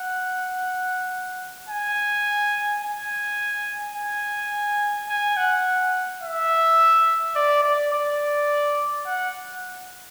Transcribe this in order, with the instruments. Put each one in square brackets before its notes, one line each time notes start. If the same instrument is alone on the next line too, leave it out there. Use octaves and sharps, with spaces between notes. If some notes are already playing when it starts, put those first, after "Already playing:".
Already playing: [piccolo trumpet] F#5
G#5
G#5
G#5
G#5
F#5
E5
D5
D5
D5
F#5